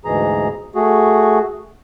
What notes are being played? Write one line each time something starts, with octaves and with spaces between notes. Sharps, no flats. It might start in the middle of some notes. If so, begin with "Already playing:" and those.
D2 G#2 B2 E3 G#4 A#5
A3 F#4 G#4